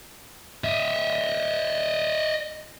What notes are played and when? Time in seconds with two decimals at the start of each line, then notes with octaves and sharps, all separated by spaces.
0.64 D#5 E5